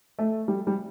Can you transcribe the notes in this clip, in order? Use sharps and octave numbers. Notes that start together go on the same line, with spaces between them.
A3
G3
G3